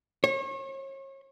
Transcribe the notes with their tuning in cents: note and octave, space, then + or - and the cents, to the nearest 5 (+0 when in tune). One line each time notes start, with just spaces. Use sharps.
C#5 -40